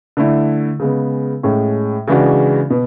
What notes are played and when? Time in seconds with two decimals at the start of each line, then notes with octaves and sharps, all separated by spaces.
0.17 D3 A3 E4
0.79 C#3 G#3 B3
1.43 A2 G#3 C#4
2.07 C#3 E3 G#3 D4 F#4
2.70 B2